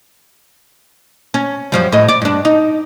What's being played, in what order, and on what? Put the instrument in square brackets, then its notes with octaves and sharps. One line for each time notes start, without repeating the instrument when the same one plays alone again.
[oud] C#4
F#2 F3 G3
A2 D#5
D5
G2 D4
D#4